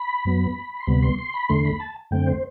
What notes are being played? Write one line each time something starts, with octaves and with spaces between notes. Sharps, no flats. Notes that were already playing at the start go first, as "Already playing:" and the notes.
Already playing: B5
F#2 F#3 B3
C6
D2 C3 G3 B3 B5
C6
C6
B5
E2 D3 A3 C6
B5
A5
F#2 D3 A3 C4 G5
C5